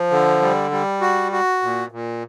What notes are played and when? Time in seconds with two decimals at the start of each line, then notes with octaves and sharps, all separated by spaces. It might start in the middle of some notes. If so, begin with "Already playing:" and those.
Already playing: F3
0.11 D3
0.42 G3
0.71 G3
1.01 F#4
1.32 F#4
1.62 A#2
1.91 A#2